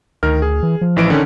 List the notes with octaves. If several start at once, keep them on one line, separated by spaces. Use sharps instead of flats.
D2 D#3 A#4 F6
G#4
E3
F3
A1 E3 D7
D3 D#3 C#4